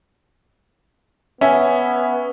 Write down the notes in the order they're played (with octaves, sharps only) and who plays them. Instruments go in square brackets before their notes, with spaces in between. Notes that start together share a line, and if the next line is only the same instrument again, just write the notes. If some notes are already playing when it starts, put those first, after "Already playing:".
[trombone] B3 [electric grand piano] C#4 [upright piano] E5 G#5